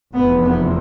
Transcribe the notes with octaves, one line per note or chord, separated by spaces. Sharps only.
F1 E2 C3 B3
B3